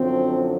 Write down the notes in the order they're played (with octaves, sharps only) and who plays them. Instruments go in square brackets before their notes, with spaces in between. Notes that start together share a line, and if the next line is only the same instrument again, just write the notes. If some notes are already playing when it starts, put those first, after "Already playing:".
Already playing: [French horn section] F#2 D3 F3 C4